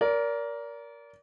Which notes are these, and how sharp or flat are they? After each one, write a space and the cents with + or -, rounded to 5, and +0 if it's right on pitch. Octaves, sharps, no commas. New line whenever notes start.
A#4 +10 D5 -30